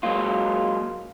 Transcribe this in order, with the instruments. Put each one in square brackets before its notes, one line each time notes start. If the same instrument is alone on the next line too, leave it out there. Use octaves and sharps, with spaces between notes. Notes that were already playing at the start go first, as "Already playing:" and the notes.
[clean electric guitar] F#3 G#3 A#3 F4